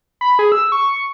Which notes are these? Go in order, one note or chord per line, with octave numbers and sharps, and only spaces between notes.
B5
G#4
E6
C#6